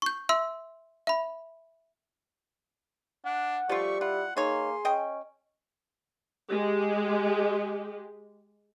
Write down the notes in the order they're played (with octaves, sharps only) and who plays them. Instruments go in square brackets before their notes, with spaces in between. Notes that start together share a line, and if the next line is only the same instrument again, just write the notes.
[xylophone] C#6 G6
E5 C6 E6
E5 B5
[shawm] D4 [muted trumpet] F#5
[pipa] F3 A3 F4 [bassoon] G3 [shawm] C#6
[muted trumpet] E4 [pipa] F4 [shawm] F#5
[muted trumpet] A#3 [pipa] D#4 C#5 [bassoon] G#4 [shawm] C6
[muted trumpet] C#4 [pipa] D#5 G5
[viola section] G#3 G4